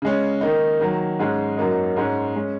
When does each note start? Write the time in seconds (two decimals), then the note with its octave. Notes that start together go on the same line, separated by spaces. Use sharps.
0.02 C#3 G#3 C#4
0.41 D#3 A#3 D#4
0.80 D#3 F#3 A#3
1.19 G#2 G#3 C#4
1.57 F#2 F#3 A#3 D#4
1.96 G#2 G#3 C#4
2.35 G#3 C#4